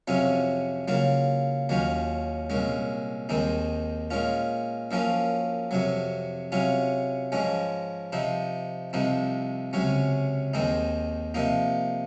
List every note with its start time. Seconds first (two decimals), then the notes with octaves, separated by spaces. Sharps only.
0.08 F2 C3 F#3 C#4 F4
0.88 C#3 F#3 A#3 F4
1.69 D#2 D#3 F#3 C#4 F4
2.50 C2 A#2 G#3 C#4
3.29 D#2 D#3 G#3 C4 D#4
4.11 A#2 G#3 C#4 F4
4.91 F#2 F3 A#3 C#4 F4
5.71 F2 C3 F#3
6.52 C3 F#3 C#4 F4
7.32 G#2 F3 G#3 C#4
8.12 C3 F3 C4 D#4
8.93 C2 C3 F3 C4 D#4
9.73 C#2 C3 F#3 C#4
10.54 D#2 D#3 G#3 C4 D#4
11.34 C3 F3 A#3 D#4